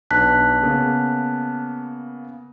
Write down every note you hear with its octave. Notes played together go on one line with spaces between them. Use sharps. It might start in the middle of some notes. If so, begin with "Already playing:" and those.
B1 D4 B4 A5 F#6 B6
C#3 A#3 B3